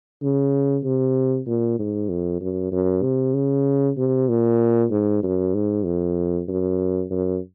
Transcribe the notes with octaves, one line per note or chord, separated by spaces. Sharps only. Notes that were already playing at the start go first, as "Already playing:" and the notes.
C#3
C3
A#2
G#2
F2
F#2
F#2
C3
C#3
C3
A#2
G#2
F#2
G#2
F2
F#2
F#2